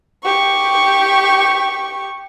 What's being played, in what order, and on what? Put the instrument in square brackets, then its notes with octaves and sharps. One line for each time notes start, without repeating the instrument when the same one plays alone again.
[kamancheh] G4 C#6